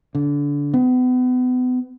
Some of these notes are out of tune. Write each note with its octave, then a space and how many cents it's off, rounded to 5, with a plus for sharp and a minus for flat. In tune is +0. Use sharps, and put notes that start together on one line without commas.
D3 -25
B3 +35